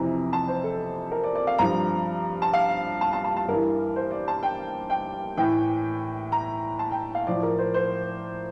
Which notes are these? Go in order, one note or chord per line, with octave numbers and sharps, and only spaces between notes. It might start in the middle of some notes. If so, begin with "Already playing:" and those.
Already playing: F2 C3 E3 A#5
A5
C5
A4
A#4
D5
D5
F5
G2 F3 A#5
A5
F5
A5
A5
A5
A5
G2 E3 A#4
C5
D5
A5
G5
G5
A2 E3 G5
A#5
A5
G5
F5
A2 F3 D5
A#4
C5
C5